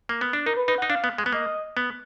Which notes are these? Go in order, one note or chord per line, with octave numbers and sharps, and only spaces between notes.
A#3
B3
D4
D#4 A#4
B4
D#4 B4
F#5
D#4
D4 F5
B3
G#3
B3
A#3 D#5
B3